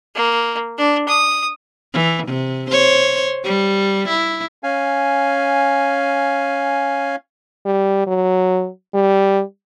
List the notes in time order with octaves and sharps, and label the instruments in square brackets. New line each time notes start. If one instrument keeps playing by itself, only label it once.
[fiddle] A#3
D4
D#6
[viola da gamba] E3
C3
C5 C#5
G3
E4
[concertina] C#4 F5 G#5
[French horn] G3
F#3
G3